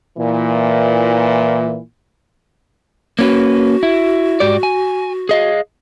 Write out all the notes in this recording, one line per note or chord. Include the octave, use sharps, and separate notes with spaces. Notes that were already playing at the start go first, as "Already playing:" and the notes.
A#2 E3
A#3 C#4 F#4 B4
E4
G#2 G4 D5
G#5
G#4 D#5 F5